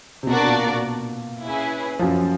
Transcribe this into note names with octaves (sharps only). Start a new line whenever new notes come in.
C3
B2 D4 F#4 A#4 D5
A#2
B2
C#4 E4 G#4 B4
F3
F#2 F#3